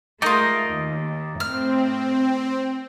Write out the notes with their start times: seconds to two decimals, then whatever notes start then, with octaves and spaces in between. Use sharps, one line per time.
0.22 G#3 A3 D#4 F4 A#4 D5 D#5 A#5
0.67 D#2
1.40 A2 C4 F6